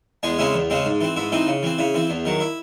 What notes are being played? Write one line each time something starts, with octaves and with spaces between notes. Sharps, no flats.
E2 G#3 G#4
C#3 G#3 C4 E4
E2
C#3 G#3 C4
G#2
E3 C4
G#2 E4
E3 C4 D#4
C#3
E3 C4
C#3 E4
E3 C4
E2
D#3 F#3
E4